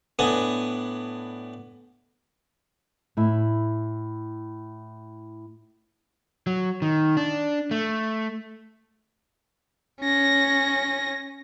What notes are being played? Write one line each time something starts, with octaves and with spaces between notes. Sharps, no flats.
A2 B3 D4 G#5 D#6
A2 E4
F#3
D#3
D4
A3
C#4 A#6